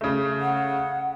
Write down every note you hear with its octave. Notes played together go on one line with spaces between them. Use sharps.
C#3 A3
F#5